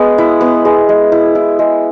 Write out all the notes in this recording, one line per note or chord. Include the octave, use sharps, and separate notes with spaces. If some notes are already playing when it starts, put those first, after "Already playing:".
Already playing: G#3 B3
E4
B3
G#3
G#3
E4
E4
G#3